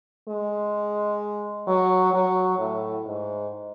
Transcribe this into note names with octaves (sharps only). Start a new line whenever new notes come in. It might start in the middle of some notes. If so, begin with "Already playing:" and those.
G#3
F#3
F#3
A2
G#2